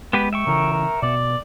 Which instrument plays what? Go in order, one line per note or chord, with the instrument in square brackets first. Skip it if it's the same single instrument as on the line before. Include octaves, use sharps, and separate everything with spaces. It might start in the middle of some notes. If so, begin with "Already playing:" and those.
[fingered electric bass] G#3 [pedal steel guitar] B3 G4 B4
[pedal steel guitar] E5 G5 C#6
[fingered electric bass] C#3 E3 [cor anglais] A#4
[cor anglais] A#4
[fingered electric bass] B2 B3 [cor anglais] D5